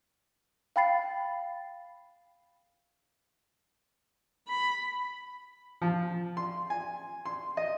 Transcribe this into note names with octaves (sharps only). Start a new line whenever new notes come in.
F5 G5 B5 A6 C7
B5
F3
C6
G#5
C6
D#5